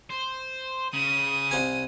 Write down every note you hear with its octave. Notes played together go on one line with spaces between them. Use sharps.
C5
C#3 D#6
C2 C5 G#5